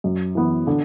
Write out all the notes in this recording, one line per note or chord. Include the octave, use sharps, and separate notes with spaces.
F#2
E3 B3
D3